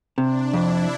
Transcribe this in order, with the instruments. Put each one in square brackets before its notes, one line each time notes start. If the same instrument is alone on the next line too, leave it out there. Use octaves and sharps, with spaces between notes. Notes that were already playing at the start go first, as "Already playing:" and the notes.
[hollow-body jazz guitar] C3 [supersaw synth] D4
[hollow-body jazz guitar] F2 [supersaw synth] E4